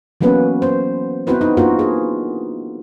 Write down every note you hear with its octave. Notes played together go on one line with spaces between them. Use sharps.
E3 F#3 A#3 B3 C#4 B4
C5
B3 C4 E4 F#4 B4 C5
D#4
A#3 D4 F4 F#4 A#4
G#4